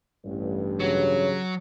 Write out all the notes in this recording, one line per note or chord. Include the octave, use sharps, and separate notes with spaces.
A1 G2
C#3 F#3 C#5